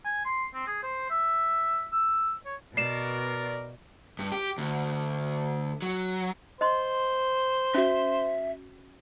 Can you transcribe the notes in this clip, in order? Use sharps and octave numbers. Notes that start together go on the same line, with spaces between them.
G#5
C6
C4
G#4
C5
E5
E6
C#5
B2 A#4 D5 C7 E7
G2
G4
D2
F#3
C5 D#5 C6
C#4 F#4 E5